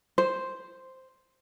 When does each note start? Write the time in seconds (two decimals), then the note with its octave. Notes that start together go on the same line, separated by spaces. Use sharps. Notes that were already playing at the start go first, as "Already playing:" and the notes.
0.18 C5